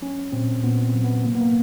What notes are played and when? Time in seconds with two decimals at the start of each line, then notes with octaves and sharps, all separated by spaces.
0.01 F#3 C#4
0.32 A#2 C4
0.63 A#2 B3
0.85 C4
0.95 F#3
1.04 B3
1.24 C3 A#3
1.35 B3
1.41 A#3